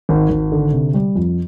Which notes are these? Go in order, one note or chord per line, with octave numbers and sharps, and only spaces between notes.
G#1
G#1
D3
C3
G3
F2